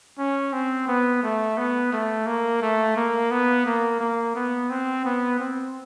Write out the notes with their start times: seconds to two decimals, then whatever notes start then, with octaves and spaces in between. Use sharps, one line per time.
0.19 C#4
0.53 C4
0.87 B3
1.23 A3
1.58 B3
1.93 A3
2.27 A#3
2.62 A3
2.97 A#3
3.32 B3
3.66 A#3
4.01 A#3
4.36 B3
4.70 C4
5.05 B3
5.40 C4